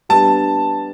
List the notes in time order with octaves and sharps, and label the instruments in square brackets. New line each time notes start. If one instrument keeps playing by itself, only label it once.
[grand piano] G3 B3 D4 [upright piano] A5